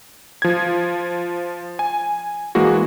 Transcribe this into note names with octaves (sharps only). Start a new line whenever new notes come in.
F3 G#6
G#5
E3 G#3 A#3 F#4